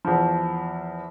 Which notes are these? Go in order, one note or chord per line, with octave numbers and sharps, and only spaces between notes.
E2 F3